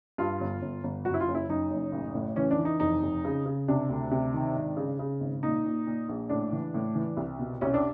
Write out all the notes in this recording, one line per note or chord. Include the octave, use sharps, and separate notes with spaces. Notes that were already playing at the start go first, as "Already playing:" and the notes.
G2 F4
G1
G1
G1
F#2 F#4
E4
F4
F#1
E4
F#2 D#4
F#1
A1
A2
E3 C#4
D4
E3
D#4
F1 D#4
F1
C#3
C#3
C3 D4
D2
C3
D#3
G#1
C#3
C#3
G#1
A#2 D#4
A#2
A#2
A#1
A2 D4
E3
A2
E3
C2
B2
C2 C#4
D4